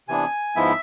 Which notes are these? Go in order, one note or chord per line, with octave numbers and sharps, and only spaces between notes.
C3 E3 B3 D4 G#5
G#2 F3 G#3 B3 E4 E5